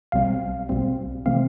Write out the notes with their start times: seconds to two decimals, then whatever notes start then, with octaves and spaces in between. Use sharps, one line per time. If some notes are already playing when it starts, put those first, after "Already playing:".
0.12 B1 B2 G3 C4 F5
0.69 B1 B2 G3 C4
1.26 C3 E3 A3 C4 F5